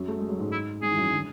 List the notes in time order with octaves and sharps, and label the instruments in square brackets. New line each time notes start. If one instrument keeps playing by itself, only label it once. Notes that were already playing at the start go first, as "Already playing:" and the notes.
Already playing: [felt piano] F#2 F#3
A3
G#3
F#3
G#2 G#3
[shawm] E4
[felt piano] G#2 G#3 [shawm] G#4
[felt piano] E3
F#2 F#3
D3